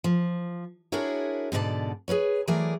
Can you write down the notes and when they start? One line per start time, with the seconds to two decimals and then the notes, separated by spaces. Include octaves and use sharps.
0.04 F3
0.92 D4 E4 F#4 G#4 A#4 C#5
1.52 G#2 B2 D3 A#4 D5 A5
2.08 G#4 A#4 B4 C#5
2.48 E3 F#3 A3 G#4 A#4 D5